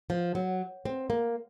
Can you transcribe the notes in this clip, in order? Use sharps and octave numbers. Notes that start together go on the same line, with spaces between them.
F3
F#3
C4
A#3